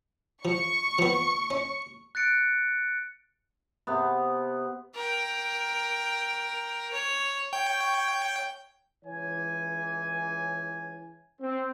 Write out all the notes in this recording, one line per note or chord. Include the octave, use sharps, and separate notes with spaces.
F3 C#6
F3 B3
C#4
F#6 A6 C#7 D7
C3 B3
A#4 G5
C#5
C#5 G5 C#6
C#2 E3 C#5 G#5
C4